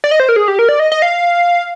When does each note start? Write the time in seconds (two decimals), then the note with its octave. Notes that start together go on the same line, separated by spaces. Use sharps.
0.04 D5
0.11 D#5
0.20 C5
0.29 A#4
0.36 G#4
0.48 G4
0.59 A#4
0.69 D5
0.80 D#5
0.92 D#5
1.02 F5